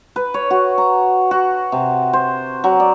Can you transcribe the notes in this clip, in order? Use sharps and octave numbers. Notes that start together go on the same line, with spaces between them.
B4
C#5
F#4
A#5
F#4
C3
C5
F#3
D5